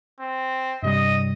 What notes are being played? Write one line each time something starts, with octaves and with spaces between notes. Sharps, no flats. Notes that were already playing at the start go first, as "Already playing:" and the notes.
C4
G2 C3 G3 D#5